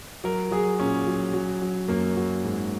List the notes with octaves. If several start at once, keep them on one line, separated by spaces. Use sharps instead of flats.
F#3 A#4
F#3 G#4
A#2 C#4
F#3
F#3
F#3
F#2 A#3
F#3
G#2